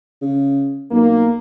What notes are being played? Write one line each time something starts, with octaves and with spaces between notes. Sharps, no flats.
C#3
B1 A#3